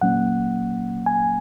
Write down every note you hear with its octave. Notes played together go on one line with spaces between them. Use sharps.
A#2 F#3 A#3 C#4 F#5
G#5